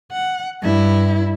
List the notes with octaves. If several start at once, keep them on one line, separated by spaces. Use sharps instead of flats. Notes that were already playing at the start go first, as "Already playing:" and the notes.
F#5
G2 E4